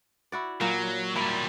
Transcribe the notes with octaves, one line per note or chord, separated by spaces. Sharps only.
E4 F#4 D5
A#2 F#3 A#3
A#2 F#3 G3 E4